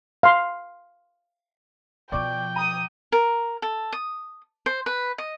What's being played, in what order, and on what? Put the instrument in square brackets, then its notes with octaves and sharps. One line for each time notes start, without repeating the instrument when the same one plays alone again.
[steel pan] F5 C6
[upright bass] B2 F3 [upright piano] D5 C#6 D6 [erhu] G5
[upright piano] A#5 [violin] D#6 D#7
[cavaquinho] A#4
A4
D#6
C5
B4
D#5